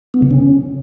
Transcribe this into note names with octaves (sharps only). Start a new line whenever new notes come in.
B3
C#3
C#4